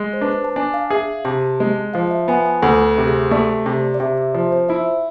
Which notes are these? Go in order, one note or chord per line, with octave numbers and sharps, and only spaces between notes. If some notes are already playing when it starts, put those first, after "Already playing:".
Already playing: G#3
C5
D4 B4
A5
D4 G#5
F5
G#4 E5
C3 A5
G#3
F3 F5
E5
B3 G#5
G#5
D2 A4
C3
G#4
A3 D5
C3
D5
C3 E5
E5
F3 C5
C5
E4 E5